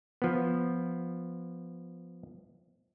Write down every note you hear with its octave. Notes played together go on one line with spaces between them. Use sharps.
F3 B3